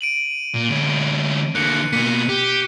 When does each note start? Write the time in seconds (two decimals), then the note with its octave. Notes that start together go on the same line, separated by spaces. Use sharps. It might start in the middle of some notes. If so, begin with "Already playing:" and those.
0.01 D7 D#7 F#7
0.56 A#2
0.70 D2 C#4
1.55 D3 A#3 F#6 C#7
1.93 B2 A#3 B6 C#7 D#7
2.29 G4